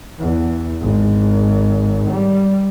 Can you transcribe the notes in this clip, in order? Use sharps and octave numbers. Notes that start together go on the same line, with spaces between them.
E2
G#1
G3